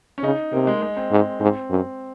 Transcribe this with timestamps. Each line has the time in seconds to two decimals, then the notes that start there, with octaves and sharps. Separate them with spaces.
0.18 C#4
0.23 C#3 D#4
0.53 C3 A#3
0.67 G#3
0.82 G#3
0.97 C4
1.11 G#2
1.40 G#2 C4
1.70 F#2